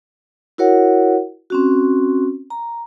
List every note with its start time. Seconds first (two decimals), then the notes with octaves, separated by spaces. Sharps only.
0.58 E4 F#4 A#4 C#5 F#5
1.50 C4 C#4 F#4
2.50 A#5